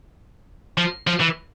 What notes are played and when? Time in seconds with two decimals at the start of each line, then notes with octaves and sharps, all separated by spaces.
0.78 F3
1.07 F3
1.20 E3